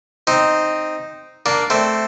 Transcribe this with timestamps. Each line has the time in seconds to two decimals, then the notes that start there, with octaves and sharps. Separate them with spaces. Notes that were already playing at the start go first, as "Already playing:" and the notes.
0.27 C4 D#4
1.46 A#3 D4
1.70 A3 C4